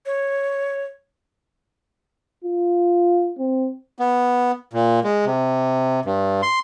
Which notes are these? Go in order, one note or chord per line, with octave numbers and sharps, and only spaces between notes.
C#5
F4
C4
B3
A#2
G#3
C3
G2
C6